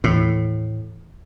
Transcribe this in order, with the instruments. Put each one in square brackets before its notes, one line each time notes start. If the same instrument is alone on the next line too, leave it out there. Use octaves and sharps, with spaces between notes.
[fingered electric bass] D#2 E3 [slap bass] A2